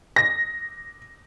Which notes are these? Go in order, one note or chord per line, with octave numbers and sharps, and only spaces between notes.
A#6